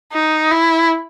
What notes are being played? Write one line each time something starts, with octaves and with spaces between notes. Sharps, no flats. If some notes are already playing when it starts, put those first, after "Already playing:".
D#4
E4